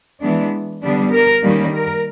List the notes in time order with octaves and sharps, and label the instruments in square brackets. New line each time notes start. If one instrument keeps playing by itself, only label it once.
[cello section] E3 G#3 B3 D4
D3 G3 B3 D4
A#4
D#3 G3 A#3 C#4
A#4